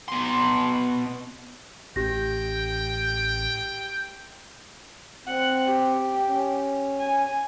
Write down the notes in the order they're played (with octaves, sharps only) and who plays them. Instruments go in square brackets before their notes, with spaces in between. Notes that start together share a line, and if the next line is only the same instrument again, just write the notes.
[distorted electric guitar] B2 C6
[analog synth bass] A1 [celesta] G4 A#6 [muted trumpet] G5
[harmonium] C4 [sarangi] F#5
[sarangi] G4
[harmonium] C#4
[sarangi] G#5